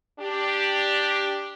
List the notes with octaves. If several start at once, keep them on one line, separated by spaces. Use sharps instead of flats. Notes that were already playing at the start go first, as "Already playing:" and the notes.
D4 G4